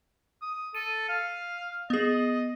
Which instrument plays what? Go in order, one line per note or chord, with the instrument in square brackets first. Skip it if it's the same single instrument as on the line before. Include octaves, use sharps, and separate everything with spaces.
[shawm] D#6
[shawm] A4 [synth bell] D#7
[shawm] F5
[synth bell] B3 G#4 [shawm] D#5